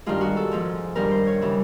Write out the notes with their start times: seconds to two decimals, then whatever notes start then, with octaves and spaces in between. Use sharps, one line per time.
0.06 G2 D#3 G#3 F4
0.21 F#4
0.37 A4
0.52 G#2 F3 G#3
0.96 G2 D#3 G3 A#4
1.11 C5
1.26 C#5
1.41 C#3 E3 G3